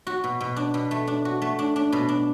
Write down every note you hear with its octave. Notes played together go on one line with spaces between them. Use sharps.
F#4
B2
B2
D4
B2
A3
D4
F#4
A3
D4
D4
B2
D4